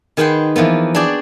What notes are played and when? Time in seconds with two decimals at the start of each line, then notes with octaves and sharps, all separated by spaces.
0.17 D#3 G#4 B4 F#5 G5 C6
0.56 E3 F3 A#3 B3
0.95 D4 F#4 G#4 D5 G5